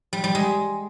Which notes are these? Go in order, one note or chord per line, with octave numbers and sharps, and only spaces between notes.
G3
G3
G#3